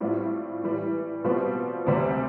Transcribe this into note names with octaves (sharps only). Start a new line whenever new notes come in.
A2 G3 C4 F4
A2 E3 G3
B2 G3 C4 F4
D2 C3 G3 C4